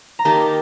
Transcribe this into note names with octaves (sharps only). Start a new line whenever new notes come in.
A#5
D#3 A#3 D#4 G4 A5